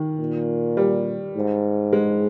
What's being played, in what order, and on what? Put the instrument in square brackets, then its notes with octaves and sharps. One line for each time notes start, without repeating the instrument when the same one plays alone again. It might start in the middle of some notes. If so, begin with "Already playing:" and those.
Already playing: [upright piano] D#3
[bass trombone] A#2
[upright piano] G3
[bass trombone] G#2
[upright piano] G#3